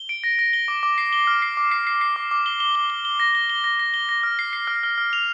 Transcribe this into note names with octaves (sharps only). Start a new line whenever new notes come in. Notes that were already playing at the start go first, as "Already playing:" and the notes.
Already playing: G7
D7
A#6
A#6
G7
D6
D6
C7
G7
F6
C7
D6
C7
C7
C7
D6
D6
G7
G7
G7
G7
G7
A#6
G7
G7
A#6
A#6
G7
A#6
F6
C7
C7
F6
F6
F6
F7